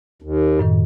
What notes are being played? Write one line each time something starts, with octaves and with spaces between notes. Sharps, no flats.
D#2
F#2 A2 D#3